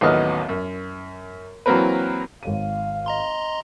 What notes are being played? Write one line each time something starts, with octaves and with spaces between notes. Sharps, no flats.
A1 D#2 F#3 B3 D#5 F6
F#2
E3 F#3 A#3 C4 A#4 B4
G#1 C#5 F5 D#7
D#5 A#5 C6